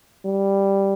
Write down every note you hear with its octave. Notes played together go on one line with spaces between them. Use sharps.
G3